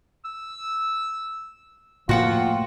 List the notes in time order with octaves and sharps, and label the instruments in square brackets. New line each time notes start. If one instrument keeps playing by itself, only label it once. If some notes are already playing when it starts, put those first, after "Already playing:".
[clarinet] E6
[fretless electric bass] A2 A#3 [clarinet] F3 [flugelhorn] F4 [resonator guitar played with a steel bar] F#4 F#5 G5